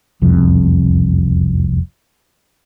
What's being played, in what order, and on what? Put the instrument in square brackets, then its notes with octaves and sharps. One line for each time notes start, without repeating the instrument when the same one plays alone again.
[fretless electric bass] E1 C2 F2